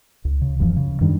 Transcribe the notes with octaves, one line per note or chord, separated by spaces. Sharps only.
C#2
C#3
D1 F#2 E3 F3
C#3
F#2 D#3 G3 D4